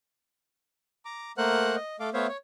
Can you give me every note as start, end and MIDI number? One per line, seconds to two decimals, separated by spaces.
1.05 1.32 82
1.05 1.32 86
1.38 1.76 57
1.38 1.76 58
1.38 1.76 70
1.38 1.76 72
1.38 1.76 78
1.38 1.76 90
1.76 1.96 75
2.00 2.10 57
2.00 2.10 69
2.00 2.10 77
2.00 2.10 86
2.14 2.27 57
2.14 2.27 59
2.14 2.27 72
2.14 2.27 73
2.14 2.27 76
2.14 2.27 77
2.28 2.37 73